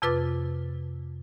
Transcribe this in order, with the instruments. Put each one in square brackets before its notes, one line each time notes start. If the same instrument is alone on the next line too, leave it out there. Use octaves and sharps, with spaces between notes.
[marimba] F2 C3 F4 B4 D6 A6